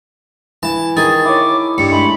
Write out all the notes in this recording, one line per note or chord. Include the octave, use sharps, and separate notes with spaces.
E3 A5
D#3 G#4 A6
E4 C#5 D6
G2 C#7
G#3 A3 B5